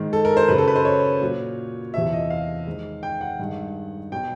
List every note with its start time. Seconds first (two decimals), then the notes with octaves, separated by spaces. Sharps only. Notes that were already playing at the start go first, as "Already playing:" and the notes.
Already playing: G#2 D#3 G#3
0.13 A4
0.25 A#4
0.37 C5
0.48 F#2 C#3 F#3 B4
0.58 A4
0.68 B4
0.76 C5
0.85 C#5
1.21 A#2 F#3
1.94 E2 C3 F3 E5
2.13 D#5
2.30 F5
2.67 G#2 D#3 G#3
3.03 G5
3.21 F#5
3.39 G2 D#3 G#3
4.12 B2 F#3 G5